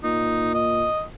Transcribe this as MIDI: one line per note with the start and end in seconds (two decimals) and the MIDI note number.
0.04 0.87 46
0.04 0.54 63
0.54 1.02 75